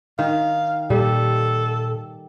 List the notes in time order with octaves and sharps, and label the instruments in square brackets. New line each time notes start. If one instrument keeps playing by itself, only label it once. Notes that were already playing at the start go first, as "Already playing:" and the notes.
[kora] D#3 [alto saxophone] F5
[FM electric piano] A#2 [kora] G3 [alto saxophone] A4